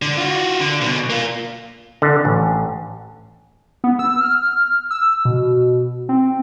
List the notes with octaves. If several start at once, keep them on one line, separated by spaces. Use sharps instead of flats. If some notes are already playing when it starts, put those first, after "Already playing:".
D3
F4 F#4
D3
B1 B2
A#3 F4
D3
A1
B3
E6
F6
E6
B2
C4